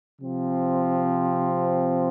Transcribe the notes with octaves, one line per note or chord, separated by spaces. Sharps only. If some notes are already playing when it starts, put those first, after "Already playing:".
C3 F3 C4